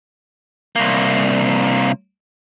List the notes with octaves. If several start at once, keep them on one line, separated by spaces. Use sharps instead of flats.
C2 A#3